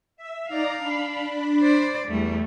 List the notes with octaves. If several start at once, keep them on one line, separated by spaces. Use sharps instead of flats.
E5
D#4 D5 F5 A#5
D4 B5
C5 D5
E2 G3 A3